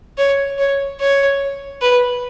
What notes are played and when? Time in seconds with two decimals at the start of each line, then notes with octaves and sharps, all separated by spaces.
0.18 C#5
0.58 C#5
1.00 C#5
1.81 B4